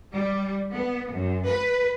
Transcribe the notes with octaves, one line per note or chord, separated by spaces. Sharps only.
G3
B3
F#2
B4